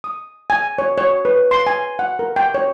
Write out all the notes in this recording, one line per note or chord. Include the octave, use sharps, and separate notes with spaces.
D#6
G#5
C#5
C#5
B4
C6
G#5
F#5
A#4
G5
C#5